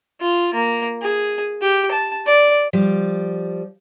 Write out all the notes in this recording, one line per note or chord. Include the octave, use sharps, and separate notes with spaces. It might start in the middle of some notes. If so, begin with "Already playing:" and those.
F4
A#3
G#4
G4
A5
D5
F3 G3